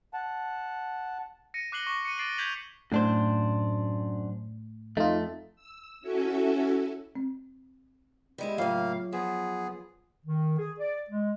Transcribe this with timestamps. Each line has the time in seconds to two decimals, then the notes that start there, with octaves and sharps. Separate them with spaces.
0.13 F#5 A5
1.54 A#6 C#7 D#7
1.72 D6 F#6 C7 F#7 G7
1.87 C#6 D6
2.05 C#7 D#7
2.18 D6 A6 C7 D7 F#7
2.38 G6 G#6 B6 F7 F#7
2.92 F#2 A2 D4 C5
4.97 F2 A3 D#4 F4
5.56 E6
6.01 C#4 E4 F#4 A4 E5 G#5
7.16 C4
8.38 G3 G#3 E4
8.58 A2 C#3 F#3 A#3 F4 C#5 F5
9.13 F3 B3 G#4
10.25 D#3
10.58 G#4
10.79 D5
11.09 G#3